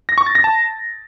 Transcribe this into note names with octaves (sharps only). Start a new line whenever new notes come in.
A#6
C#6
A6
A#6
A5